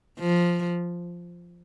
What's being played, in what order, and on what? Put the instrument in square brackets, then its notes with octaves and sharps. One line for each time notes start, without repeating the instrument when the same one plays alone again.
[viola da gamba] F3